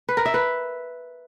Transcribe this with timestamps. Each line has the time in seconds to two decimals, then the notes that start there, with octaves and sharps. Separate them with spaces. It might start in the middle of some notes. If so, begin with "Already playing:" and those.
0.09 B4
0.17 A#4
0.26 E5
0.34 B4